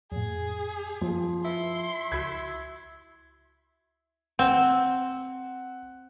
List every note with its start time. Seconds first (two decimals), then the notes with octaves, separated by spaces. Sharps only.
0.12 F2 A2 G#4
1.01 F#2 F3
1.45 E4 C6
2.12 C#2 F#4 E6 G#6
4.39 C4 F#5